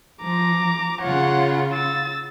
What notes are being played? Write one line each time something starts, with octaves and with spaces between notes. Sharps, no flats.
F3 A#5 D6
C#3 F4 C#5 F#5
E6 A6